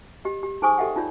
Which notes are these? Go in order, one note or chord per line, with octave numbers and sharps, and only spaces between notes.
G4 D#5
G4
D#4 G#4 C5 G#5 C#6 D#6
G4 A4 D#5 E5 F#5 G5
D#4 F4 C#5 D5